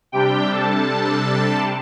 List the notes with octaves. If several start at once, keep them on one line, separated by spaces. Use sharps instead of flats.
C3 G3 D4 G4 G5
A4 A5